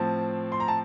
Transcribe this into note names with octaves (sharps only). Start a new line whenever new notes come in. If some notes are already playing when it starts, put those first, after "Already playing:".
Already playing: A2 F3 C4 A5
C6
A#5
A5